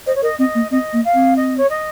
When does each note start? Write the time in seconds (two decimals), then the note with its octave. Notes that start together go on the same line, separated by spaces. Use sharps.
0.06 C5 D#5
0.15 C#5
0.22 A#4 D#5
0.39 C4 D#5
0.55 A#3
0.71 C4 D#5
0.93 A#3
1.04 F5
1.14 C4
1.36 D#5
1.57 C#5
1.69 D#5